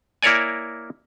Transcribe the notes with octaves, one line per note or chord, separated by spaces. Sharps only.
A#3 E4 A#4 C#5 D5 G#5